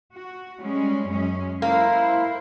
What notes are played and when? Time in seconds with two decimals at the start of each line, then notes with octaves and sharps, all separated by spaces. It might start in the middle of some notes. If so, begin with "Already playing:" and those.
0.14 F#4
0.61 G3 G#3 C#4
1.08 F#2 G#3 C#4
1.62 A#3 E4 C5